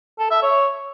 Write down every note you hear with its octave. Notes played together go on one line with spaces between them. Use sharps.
A4
E5
C#5